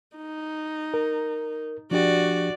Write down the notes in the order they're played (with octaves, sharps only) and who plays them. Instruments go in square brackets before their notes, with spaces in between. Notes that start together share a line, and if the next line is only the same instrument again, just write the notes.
[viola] D#4
[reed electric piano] A#4
[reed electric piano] F3 D4 G4 [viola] F#4 D5